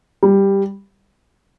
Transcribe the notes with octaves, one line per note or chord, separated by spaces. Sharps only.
G3